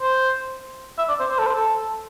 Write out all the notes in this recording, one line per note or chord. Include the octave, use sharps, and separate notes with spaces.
C5
E5
D5
C5
C5
A4
C5
A4